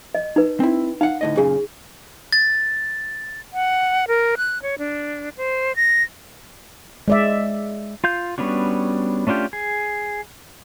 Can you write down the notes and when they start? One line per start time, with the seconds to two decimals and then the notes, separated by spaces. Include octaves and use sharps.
0.15 D#5
0.36 D#4 B4
0.60 C4 E4
1.01 D#4 F5 F#5
1.21 D2 A2 D#5
1.37 F#2 A#2 C#3 G#4
2.33 A6
3.53 F#5
4.08 A#4
4.37 F#6
4.62 C#5
4.79 D4
5.37 C5
5.76 A#6
7.08 G#3 D5 E5
8.04 F4 F5 G6
8.38 G3 B3 C#4 D4 F#4
9.27 A3 C#4 D4 F4 G4
9.53 G#4